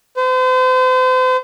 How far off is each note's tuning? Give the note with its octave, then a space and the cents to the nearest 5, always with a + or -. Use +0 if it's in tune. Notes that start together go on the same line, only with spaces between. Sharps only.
C5 -40